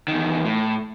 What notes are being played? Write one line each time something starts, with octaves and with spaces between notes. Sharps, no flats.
E2 D#3
A2